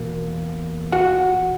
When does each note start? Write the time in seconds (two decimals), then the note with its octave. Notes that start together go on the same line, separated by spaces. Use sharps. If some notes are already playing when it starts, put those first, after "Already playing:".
Already playing: E2 B2 A#3
0.92 F#4 F#5